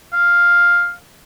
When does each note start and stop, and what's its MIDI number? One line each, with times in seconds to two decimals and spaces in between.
0.13 0.91 77